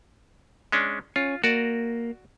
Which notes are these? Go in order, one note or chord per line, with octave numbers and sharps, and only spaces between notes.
G#3 C#4 D4
C#4 F4
A#3 F#4 D5